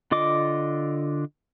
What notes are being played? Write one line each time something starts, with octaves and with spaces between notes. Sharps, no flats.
D3 F4 D#5 D6